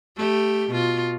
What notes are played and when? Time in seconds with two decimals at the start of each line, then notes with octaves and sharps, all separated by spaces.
0.16 A3 G4
0.70 B2 F4